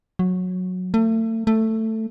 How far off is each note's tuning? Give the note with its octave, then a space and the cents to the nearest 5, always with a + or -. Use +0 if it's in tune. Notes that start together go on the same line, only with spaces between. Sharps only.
F#3 -15
A3 +35
A3 +10